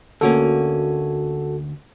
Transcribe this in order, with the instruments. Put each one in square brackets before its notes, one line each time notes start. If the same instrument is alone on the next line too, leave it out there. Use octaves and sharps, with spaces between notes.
[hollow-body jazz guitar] D2 A#3 C#4 [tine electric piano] F#4 A4